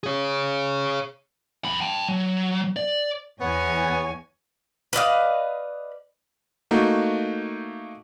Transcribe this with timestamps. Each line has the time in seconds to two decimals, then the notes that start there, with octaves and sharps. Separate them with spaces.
0.03 G#4 C#5
1.64 F2 B5
1.80 G5 A5
2.08 F#3
2.76 D5
3.41 E2 B3 C#5 G#5
4.93 B4 D5 D#5 F5
6.71 A3 A#3 D#4 F#4